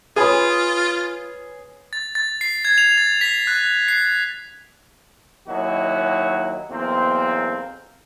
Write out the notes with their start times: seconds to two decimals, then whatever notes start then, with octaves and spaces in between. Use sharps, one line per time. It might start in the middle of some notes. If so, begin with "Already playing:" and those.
0.16 F4 G#4 B4 C#5 G#5 B5 D#6
1.93 A6
2.15 A6
2.41 C7
2.65 G#6
2.78 F7
2.97 A6
3.21 B6
3.47 F#6
3.88 C7
5.47 D#2 F#3 D#4 E4 F#4
6.69 B1 E2 A#3 C4